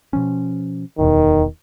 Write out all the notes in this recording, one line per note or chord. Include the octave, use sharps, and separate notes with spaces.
B2 F3 C#4
D1 E2 B2 D#3